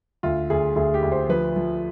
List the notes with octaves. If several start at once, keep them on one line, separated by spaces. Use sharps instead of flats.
D2 F4
D2 G#4
D2 G#4
G4
D2
C5
F3 B4
F3